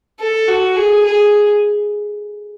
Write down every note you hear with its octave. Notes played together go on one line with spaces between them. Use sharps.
A4
F#4
G#4
G#4